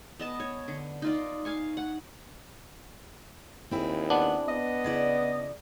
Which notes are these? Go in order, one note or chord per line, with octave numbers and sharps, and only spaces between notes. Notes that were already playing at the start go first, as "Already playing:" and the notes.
B3 D#5 A5
C#5
D3
D#4 F4 D5
F5 G#5 C#6
F#5
D#2 C4 E4 G#4
B3 D4
B3 D#5
C#3 E4 D5